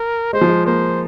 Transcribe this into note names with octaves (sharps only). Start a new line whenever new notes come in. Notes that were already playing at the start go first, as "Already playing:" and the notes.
Already playing: A#4
G#3 C5
F3
G#3
A#3 C5